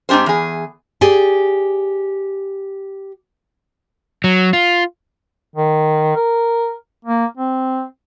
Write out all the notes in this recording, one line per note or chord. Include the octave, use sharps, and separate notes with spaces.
G#2 C4 D4 G4 C5
E2 G#4
G4 G#4 D5 G#5
F#3
F4
D#3
A#4
A#3
C4